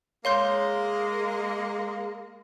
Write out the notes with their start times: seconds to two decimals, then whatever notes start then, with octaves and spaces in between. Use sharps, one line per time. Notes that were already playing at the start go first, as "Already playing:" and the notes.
0.25 G#3 A#3 C#5 F5 C6 G6